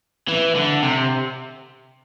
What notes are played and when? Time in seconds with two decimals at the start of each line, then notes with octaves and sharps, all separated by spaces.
0.28 E3
0.55 D3
0.82 C3